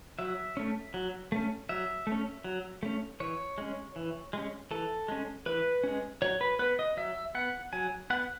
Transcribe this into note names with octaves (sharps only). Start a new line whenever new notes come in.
F#3 E5
A3 C#4
F#3
A3 C#4
F#3 E5
A3 C#4
F#3
A3 C#4
E3 C#5
G#3 C#4
E3
G#3 C#4
E3 A4
G#3 C#4
E3 B4
G#3 C#4
F#3 C#5
B4
B3 B4
D#5
F#3 E5
B3 F#5
F#3 G#5
B3 F#5